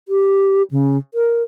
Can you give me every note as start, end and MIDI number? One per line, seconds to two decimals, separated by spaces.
0.08 0.62 67
0.71 0.97 49
1.14 1.43 70